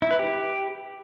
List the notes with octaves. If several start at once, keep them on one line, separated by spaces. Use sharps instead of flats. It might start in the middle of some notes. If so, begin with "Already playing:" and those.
E4
B4
G4